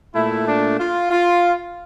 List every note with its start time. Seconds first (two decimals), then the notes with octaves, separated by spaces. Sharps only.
0.14 A#2 A3 E4
0.46 D4
0.78 F4
1.10 F4